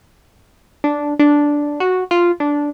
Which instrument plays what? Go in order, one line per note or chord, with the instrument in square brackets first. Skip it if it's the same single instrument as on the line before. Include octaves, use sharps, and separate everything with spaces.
[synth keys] D4
D4
F#4
F4
D4